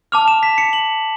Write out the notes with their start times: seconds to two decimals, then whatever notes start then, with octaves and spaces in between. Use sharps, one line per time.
0.12 A5 D6 F6 F7
0.28 E7
0.43 B6
0.58 C#7
0.73 F#7